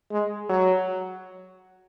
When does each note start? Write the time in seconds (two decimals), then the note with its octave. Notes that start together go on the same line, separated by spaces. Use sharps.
0.12 G#3
0.49 F#3